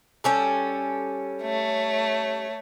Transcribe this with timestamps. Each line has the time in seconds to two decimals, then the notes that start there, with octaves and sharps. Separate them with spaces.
0.24 G3 C#4 A4
1.43 A3 C#5